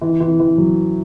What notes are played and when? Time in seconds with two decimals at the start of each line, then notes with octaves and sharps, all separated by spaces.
0.02 E3
0.21 E3
0.40 E3
0.58 F#3